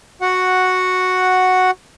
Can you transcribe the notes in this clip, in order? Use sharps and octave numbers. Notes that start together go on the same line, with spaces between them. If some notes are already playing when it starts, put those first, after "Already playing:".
F#4 F#5